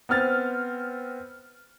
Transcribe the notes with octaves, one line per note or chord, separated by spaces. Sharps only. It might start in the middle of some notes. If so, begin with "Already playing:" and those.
B3 C4 F6 A6